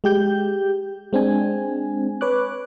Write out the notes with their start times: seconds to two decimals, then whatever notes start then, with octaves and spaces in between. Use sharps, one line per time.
0.04 G#3 G4 G6
1.13 G#3 C4 D4 G#5
2.21 B4 C#5 D6 F#6